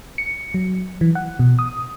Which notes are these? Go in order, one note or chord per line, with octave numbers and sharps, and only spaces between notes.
C#7
F#3
E3
F#5
B2
D#6